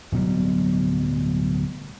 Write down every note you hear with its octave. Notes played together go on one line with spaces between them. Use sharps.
D1 B2 F#3 G3